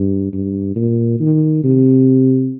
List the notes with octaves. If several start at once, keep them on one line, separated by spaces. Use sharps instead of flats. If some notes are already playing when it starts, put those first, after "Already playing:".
Already playing: G2
G2
A#2
D#3
C3